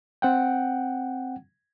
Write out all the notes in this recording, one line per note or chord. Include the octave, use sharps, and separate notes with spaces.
C4 F#5 G5